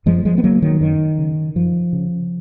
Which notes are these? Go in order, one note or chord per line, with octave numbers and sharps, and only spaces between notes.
F#2 F3 G#3
F3 G#3
B3
C#3 F#3 A#3
D#3 F#3
F#2 D#3
C#3
F#2 F3
C#3